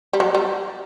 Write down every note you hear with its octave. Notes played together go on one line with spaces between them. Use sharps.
G3
F#3
G3